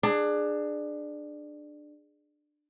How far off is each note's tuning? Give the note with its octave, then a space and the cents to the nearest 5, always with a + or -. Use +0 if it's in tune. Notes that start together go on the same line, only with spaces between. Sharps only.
D4 +20 G#4 +0